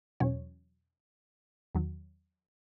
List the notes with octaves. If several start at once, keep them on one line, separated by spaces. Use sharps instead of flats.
E2 B2 F#3 C#4 C#5
E2 D#3 F#3